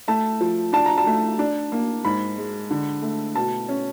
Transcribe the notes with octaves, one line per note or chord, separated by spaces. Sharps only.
A3 A5
F3
D4 A5
A#5
A5
A3
D4
A#3
G#2 B5
G#3
D3
A3
B2 A5
C#4